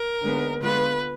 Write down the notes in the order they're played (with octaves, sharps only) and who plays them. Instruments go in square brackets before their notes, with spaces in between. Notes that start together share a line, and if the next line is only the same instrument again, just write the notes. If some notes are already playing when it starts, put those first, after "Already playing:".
Already playing: [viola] A#4
[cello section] D#2 D3 G#3 B3
[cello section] D3 G#3 B3 F4 [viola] B4